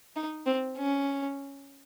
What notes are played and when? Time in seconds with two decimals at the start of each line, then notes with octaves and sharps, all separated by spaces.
0.16 D#4
0.46 C4
0.78 C#4